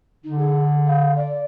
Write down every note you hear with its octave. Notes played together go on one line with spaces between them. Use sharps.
D3 D#4
G#4
F5
D5